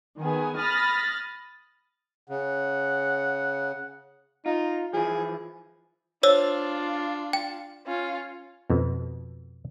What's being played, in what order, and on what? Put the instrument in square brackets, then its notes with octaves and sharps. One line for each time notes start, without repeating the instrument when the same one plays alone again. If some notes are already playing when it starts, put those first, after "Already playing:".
[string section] D#3 B3 G#4
B5 D#6 F6 A6 A#6
[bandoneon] C#3 [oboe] F#5
[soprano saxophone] D#4 [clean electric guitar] F4
[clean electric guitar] E3 F3 [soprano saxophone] G#4
[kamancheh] D4 F4 [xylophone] C5 C#5 E6
[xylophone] G5
[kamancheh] C#4 F4
[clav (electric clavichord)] F2 B2